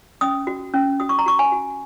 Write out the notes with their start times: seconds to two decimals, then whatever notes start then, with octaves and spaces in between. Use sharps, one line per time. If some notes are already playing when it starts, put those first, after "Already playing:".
0.21 C#4 D#6
0.47 F#4
0.74 C#4
1.00 F#4 D#6
1.09 C#6
1.19 A#5
1.26 F#4 C#6
1.39 G#5
1.52 F#4